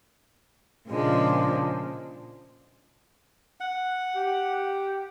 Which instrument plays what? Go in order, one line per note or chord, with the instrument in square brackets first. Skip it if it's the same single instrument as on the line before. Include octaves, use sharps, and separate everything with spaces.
[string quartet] A#2 C#3 F3 G#3 D4
[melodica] F#5
[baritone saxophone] G4